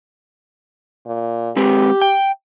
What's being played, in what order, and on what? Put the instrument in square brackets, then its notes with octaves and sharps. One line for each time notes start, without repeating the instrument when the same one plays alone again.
[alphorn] A#2
[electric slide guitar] G#3 C4 B4 [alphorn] G4
[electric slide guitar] G5